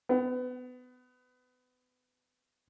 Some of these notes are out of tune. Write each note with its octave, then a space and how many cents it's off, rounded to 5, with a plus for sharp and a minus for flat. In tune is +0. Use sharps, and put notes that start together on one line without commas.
B3 +25